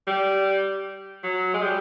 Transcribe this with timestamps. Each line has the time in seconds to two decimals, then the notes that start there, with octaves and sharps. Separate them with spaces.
0.07 G3
1.23 F#3
1.54 G#3
1.62 G3